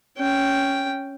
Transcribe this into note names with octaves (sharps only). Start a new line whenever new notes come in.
C#4 G5